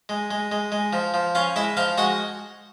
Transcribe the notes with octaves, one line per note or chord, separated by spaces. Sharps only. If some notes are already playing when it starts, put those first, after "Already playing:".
G#3
G#3
G#3
G#3
F3
F3
C#4 F4 F5
G#3 E4 E5
F3 F4 F5
G#3 F#4 F#5